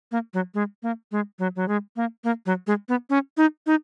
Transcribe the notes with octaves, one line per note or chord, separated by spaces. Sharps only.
A#3
F#3
G#3
A#3
G#3
F#3
F#3
G#3
A#3
A#3
F#3
G#3
B3
C#4
D#4
D#4